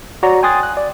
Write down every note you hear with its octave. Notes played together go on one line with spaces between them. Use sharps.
F#4 C#5 D5 A#5
G5 G#5 C6 D#6 F#6 A6
F#6
D5